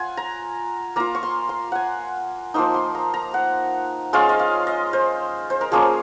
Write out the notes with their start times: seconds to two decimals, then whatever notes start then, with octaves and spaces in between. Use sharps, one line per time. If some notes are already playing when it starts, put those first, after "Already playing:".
Already playing: F4 F#5 G#5
0.17 A#5
0.96 A#3 F4 A#5
1.15 C#6
1.23 C6
1.49 C6
1.72 F#5 G#5
2.54 F3 A#3 D#4 C6
2.74 C6
2.95 A#5
3.14 A#5
3.34 F#5
4.13 G#3 C#4 F4 F5
4.29 D#5
4.39 F5
4.67 D#5
4.93 C5
5.50 C5
5.61 A#4
5.72 F3 A#3 C#4 F4 G#4